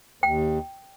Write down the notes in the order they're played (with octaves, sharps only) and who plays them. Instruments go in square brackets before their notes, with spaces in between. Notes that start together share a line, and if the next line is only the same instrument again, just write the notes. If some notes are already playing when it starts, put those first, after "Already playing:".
[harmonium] D#2 [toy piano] G5